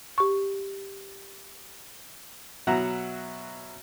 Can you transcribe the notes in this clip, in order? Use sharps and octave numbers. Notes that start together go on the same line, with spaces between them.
G4 C#6
B2 F#3 E5 F#5 A#5